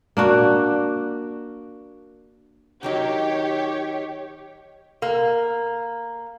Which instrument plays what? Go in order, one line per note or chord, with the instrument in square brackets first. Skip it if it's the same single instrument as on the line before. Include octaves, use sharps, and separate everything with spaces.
[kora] A#3 D4 F#4
[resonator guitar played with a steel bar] D#3 F#3 D#4 [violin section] G4 C#5
[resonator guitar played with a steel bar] A#3